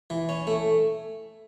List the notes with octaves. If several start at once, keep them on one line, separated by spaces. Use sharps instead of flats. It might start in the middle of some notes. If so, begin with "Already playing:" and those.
E3
C#4
A3